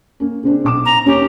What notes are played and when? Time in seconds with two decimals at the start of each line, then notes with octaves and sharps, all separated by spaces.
0.20 A#3 C#4
0.43 C#3 C4 D4
0.64 B1 D6 E7
0.85 A#5
1.06 D#2 C#4 G4